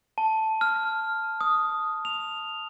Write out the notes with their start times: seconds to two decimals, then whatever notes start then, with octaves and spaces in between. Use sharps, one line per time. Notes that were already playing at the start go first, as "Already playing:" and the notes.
0.18 A5
0.61 F6
1.41 D#6
2.05 F7